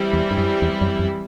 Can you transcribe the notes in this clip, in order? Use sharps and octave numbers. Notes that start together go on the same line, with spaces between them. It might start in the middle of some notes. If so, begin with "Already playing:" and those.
Already playing: E3 G3 C4 E4
E2
G2
F#2
E2
F#2
F#2